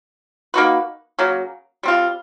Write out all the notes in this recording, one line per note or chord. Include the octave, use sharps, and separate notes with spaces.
A#3 D#4 F#4 B4
C#3 F#3 A#3
G3 C4 F4